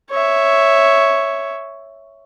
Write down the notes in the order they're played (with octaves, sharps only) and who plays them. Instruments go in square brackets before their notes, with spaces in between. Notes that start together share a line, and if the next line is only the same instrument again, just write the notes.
[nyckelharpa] C#5 E5